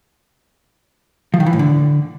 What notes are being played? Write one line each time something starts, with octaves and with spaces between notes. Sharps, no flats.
F3
D#3
E3
A2
D3